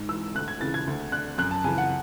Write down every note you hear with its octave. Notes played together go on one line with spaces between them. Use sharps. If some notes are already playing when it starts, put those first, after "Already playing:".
Already playing: G#2
E3 E6
D2 F#6
G#6
C#3 E3 A6
G#6
D2
D3 F#6
F#2 F#6
A5
C#3 E3 G#5
F#5